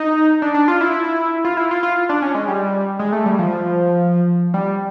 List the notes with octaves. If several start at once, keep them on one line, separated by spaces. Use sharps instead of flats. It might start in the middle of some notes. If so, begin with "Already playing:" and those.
Already playing: D#4
D4
D4
F4
E4
F4
E4
F4
F4
D4
C#4
G#3
G3
G#3
A3
G3
F3
G3